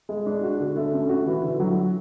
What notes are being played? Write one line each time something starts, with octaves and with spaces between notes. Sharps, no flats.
G#3
D4
F#4
D3
A3
C#4
F#4
E3
D3
F#3